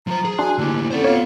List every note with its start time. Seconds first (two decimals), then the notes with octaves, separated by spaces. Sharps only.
0.07 F3 C5 A#5
0.25 G#4
0.39 D4 F#4 G#5 C6
0.58 D2 A#3 E4 G4
0.91 C4 C#4 A4 C5 D5 F#5
1.04 B3 F4 C#5 F5